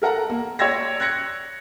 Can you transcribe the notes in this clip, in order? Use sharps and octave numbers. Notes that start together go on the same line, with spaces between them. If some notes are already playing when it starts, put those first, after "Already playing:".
A4 A#4 F#5 A5 A#5
A#3
C#5 D5 G5 E6 G#6 A#6
F#6 G#6 A#6 C#7